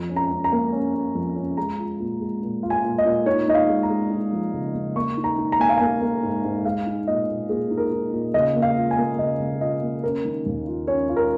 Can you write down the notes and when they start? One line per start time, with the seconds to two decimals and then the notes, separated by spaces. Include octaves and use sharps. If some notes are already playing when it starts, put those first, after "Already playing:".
Already playing: F2
0.09 C#4
0.16 A#5
0.31 C#4
0.44 A#5
0.52 A#3
0.73 C#4
0.94 C#4
1.15 F2
1.36 C#4
1.57 G#3 A#5
1.78 F4
2.00 A#2
2.21 G#3
2.43 A#2
2.63 F4
2.70 G#5
2.84 A#2
2.98 D#5
3.05 A#2
3.26 D#4 C#5
3.48 D#4 D#5
3.54 F5
3.69 G#3
3.83 A#5
3.90 G#3
4.11 D#4
4.33 F3
4.54 C#3
4.75 C#3
4.96 A#3 C#6
5.17 D#4
5.24 A#5
5.38 D#4
5.52 A#5
5.59 A#3 G#5
5.69 F5
5.78 A#3 G#5
6.02 A#3
6.23 G#2
6.44 G#2
6.65 G#3 F5
6.86 D#4
7.07 A#2 D#5
7.29 A#2
7.49 A#2 G#4
7.71 D#4
7.77 A#4
7.92 D#4
8.13 A#2
8.34 C#3 D#5
8.55 A#3
8.62 F5
8.76 F4
8.91 G#5
8.98 A#3
9.19 C#3 D#5
9.40 C#3
9.61 F4 D#5
9.82 A#3
10.03 C#4 A#4
10.25 D#3
10.46 D#2
10.67 F4
10.88 C#4 C#5
11.09 F4
11.16 A#4